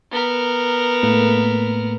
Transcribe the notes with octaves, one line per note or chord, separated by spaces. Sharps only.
B3 A#4
A2 A3 A#3